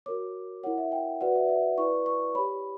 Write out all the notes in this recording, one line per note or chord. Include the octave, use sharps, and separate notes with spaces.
F#4 A#4 C#5 D6
E4 A#4 C#5 F#5
E5
G5
F#4 B4 D5 F#5
E5
D5
E5
E4 B4 D5 C#6
C#6
G4 C#5 B5